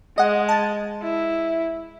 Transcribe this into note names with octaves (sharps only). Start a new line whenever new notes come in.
G#3 D#5 F#5
A5
E4